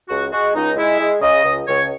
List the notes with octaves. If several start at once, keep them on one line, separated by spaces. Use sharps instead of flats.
C#2 F#4
G#3 F#4
C#2 D#4
G#3 E4
G#3
C#3 D#5
C#2
C#2 C#5